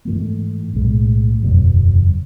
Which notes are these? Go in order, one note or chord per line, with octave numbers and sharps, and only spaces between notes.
G#2 E3 A3
B1 A2 G#3
F#1 E2 B2 F#3